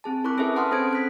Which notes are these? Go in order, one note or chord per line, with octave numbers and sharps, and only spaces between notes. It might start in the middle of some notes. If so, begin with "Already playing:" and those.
C4 G#4 A5
E4 A#4 B5 C#6 D6 F#6
C#4 G#4 A4 B4 E5 A5
F#5 A5 B5 C6 D#6 F6
C4 C#4 A4 C5 G#6 D7
A4 F#6 B6